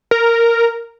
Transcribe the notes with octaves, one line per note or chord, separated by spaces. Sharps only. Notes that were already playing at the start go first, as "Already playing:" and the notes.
A#4